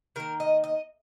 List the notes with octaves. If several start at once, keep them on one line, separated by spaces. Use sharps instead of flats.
D#3 A#3 A#4
D#5
D#5